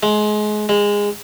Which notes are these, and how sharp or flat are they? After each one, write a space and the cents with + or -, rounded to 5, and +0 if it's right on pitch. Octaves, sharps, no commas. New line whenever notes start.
G#3 +25
G#3 -20